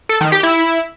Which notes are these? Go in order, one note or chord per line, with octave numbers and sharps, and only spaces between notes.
A4
D#3
G4
E4